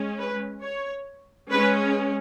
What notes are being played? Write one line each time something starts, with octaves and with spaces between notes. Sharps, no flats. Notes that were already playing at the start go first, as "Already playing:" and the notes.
Already playing: G#3 C#4
B4
C#5
G#3 C#4 B4